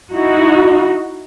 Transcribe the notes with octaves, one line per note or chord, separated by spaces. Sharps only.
D#4 E4 F#4